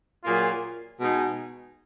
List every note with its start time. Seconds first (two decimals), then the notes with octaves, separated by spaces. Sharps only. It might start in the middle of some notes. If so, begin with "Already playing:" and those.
0.24 A#2 F#3 A#3 F4 G#4
0.99 B2 G#3 D#4 G#4